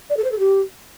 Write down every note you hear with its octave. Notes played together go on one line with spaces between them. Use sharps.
D5
A4
C5
A4
G4